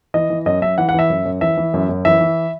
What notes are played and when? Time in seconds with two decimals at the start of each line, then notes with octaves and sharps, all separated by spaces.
0.14 E3 D#5
0.30 E3
0.46 F#2 D#5
0.62 F#2 E5
0.78 E3 F#5
0.89 F#5
0.94 E3 E5
1.10 F#2
1.25 F#2
1.41 E3 E5
1.57 E3
1.74 F#2
1.89 F#2
2.05 E3 E5
2.21 E3